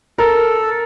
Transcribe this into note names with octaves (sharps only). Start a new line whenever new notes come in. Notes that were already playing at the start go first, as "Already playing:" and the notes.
A4 A#4